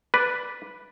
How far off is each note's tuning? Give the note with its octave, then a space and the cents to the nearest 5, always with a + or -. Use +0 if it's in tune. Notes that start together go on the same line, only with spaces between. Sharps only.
B4 -5 D5 +0